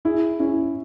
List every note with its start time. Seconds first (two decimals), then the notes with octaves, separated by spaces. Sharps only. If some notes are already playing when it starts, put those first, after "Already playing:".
0.05 E4 G#4
0.40 C#4 E4